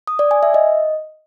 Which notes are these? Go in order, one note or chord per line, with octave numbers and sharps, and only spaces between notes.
D#6
D5
G#5
E5
D#5